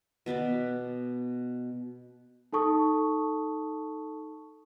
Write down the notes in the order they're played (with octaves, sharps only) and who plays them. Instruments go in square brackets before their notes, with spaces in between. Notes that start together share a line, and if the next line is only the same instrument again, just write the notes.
[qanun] B2 B3 B4 D5
[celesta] D#4 A4 A5 C#6 D#6